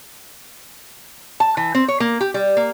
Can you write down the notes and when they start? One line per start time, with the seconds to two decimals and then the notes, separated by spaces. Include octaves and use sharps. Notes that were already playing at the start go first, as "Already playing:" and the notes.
1.40 A5
1.57 E3
1.75 C4
1.88 C#5
2.00 A#3
2.21 G4
2.34 G3
2.57 A#3